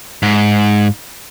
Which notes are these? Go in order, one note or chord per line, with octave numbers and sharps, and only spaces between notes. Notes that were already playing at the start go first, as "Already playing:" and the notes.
G#2